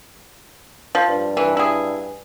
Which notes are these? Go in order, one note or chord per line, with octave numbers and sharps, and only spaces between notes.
F3
G2
E3
E4 G#4